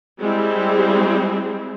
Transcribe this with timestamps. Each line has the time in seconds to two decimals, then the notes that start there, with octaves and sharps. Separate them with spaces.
0.20 G3 G#3 C4 E4